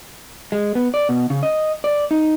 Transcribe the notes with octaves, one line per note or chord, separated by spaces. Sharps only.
G#3
B3
D5
B2
C#3
D#5
D5
D#4